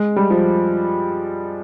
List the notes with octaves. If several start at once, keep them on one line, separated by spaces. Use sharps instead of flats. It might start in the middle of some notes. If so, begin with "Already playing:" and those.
Already playing: G#3
G3
F3